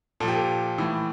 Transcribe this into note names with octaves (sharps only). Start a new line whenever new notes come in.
A#2 F3 G4 A4
A4
A2 E3